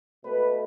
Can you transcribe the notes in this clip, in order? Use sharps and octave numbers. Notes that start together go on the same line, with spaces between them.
B2 A3 B4